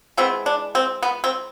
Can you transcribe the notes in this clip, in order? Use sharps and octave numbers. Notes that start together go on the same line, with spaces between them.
E3 G#3 B3 C4
D4
C4
B3
C4